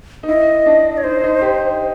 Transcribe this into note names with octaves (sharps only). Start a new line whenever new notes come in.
D#4
E4 D#5
D4
C#5
D#4 C5
D#4
G4